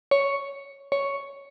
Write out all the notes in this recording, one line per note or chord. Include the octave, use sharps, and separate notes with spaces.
C#5
C#5